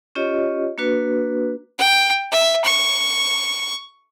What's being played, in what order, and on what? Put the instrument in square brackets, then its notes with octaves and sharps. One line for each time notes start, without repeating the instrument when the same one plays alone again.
[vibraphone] C#4 F4 G4 C#5 D#5
A#3 D4 F#4 B4
[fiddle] G5
E5
C#6